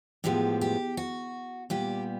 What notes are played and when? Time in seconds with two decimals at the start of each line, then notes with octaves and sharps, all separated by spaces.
0.24 A2 F3 G#3 B3 G4
0.61 G4
0.97 F#4
1.70 A#2 G3 B3 G4